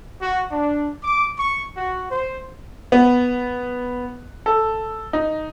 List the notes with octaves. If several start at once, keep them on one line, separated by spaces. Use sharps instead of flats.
F#4
D4
D6
C#6
F#4
C5
B3
A4
D#4